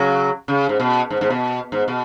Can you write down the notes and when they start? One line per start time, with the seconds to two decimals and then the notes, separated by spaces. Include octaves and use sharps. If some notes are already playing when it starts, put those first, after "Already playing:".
Already playing: C#3 F#3
0.48 C#3
0.69 G#2
0.80 B2
1.10 G#2
1.21 G#2
1.30 B2
1.72 G#2
1.88 B2